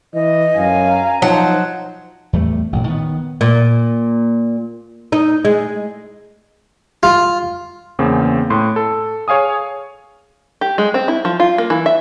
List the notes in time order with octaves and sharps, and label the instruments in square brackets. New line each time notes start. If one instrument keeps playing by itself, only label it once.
[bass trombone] E3 [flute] D#5
[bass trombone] F#2 [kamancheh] F5 G#5
[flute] A#5
[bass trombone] F3 [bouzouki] F#3 A5 [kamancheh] D#4 C5
[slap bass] E2 A2 G3 A3
A1 A#2
D#3 B3
[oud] A#2
D#4
G#3
[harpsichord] F4
[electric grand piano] E2 C#3 A#3 C4
A2 C6
A4
G#4 C#5 F5 G#5 D#6
[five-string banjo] G4
G#3
C4
E4
F3
F4
A#3
E3
E5